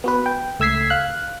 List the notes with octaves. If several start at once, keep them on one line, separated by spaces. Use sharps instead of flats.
B3 F#4 B4
G5
C#2 A3 E6 G#6 B6 C7
F5 F#6